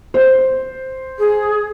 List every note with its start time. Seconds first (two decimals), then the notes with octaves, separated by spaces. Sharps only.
0.14 C5
1.18 G#4